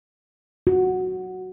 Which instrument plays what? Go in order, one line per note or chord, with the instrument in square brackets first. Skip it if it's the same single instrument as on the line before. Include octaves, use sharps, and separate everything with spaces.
[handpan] F#4